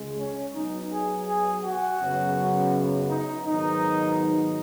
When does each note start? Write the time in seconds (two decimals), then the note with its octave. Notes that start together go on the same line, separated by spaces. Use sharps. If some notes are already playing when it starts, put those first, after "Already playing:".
Already playing: C#2 C#3 G#3
0.19 C#4
0.55 B2 F#3 B3 D#4
0.92 G#4
1.28 G#4
1.64 F#4
2.01 F#2 C#3 F#3 B3
3.10 D#4
3.46 G#2 D#3 F#3 B3 D#4